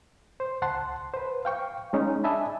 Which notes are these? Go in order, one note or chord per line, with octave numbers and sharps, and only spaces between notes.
C5
C#2 F#5 A5 C6
B4 C5
F5 G5 C#6
G#3 C#4 D#4
D4 D#5 E5 G#5 A5 B5